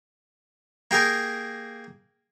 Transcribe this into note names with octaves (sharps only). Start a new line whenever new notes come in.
A#3 G4 G#4 A#4